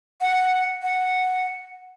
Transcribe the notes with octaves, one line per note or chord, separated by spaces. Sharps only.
F#5
F#5